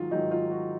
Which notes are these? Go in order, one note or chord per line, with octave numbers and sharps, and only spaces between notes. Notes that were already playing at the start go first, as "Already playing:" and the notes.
Already playing: G#2 D#3 F#3 F4
G#2 D#3 F#3 D#4
F4
F#4